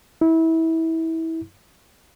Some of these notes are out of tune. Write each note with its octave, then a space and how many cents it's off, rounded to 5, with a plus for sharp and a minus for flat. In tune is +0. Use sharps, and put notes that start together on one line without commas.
E4 -25